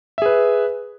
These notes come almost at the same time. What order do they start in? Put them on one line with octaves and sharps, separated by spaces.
E5 G#4 B4